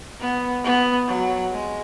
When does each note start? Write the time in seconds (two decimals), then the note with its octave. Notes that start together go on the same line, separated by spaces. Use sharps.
0.20 B3
0.64 B3
1.08 F#3
1.51 G#3